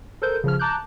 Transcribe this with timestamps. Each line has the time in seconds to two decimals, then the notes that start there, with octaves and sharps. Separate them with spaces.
0.22 A4 A#4 C5 G6
0.44 C#3 F3 F6
0.59 A5 A#5 D6 F#6 G6